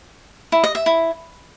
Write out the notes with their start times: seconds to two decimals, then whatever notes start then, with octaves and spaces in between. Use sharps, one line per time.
0.52 E4
0.64 D#5
0.75 E5
0.86 E4